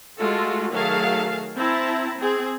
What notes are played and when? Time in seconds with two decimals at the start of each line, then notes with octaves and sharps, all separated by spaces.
0.18 G#3 A3 F4 F#4 A4
0.72 D#3 F#3 A3 G#4 F5 A5
1.55 C4 E4 A5 A#5
2.19 C4 G#4